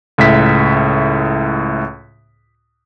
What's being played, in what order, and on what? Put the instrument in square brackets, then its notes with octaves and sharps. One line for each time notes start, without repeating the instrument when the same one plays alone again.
[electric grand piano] C#2 A2 E5 B6